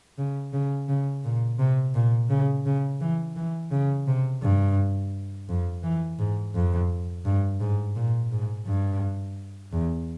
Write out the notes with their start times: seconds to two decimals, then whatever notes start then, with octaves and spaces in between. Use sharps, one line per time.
0.18 C#3
0.53 C#3
0.88 C#3
1.24 A#2
1.59 C3
1.94 A#2
2.29 C#3
2.66 C#3
3.01 E3
3.36 E3
3.71 C#3
4.07 C3
4.42 G2
5.49 F2
5.83 E3
6.19 G#2
6.55 F2
7.25 G2
7.60 G#2
7.96 A#2
8.31 G#2
8.66 G2
9.72 E2